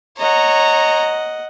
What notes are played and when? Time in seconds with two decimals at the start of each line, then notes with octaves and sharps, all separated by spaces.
0.19 C#5 D#5 F#5 A#5